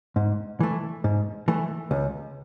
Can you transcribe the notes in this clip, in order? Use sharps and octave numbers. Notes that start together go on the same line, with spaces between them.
G#2
E3 A3
G#2
E3 A3
C#2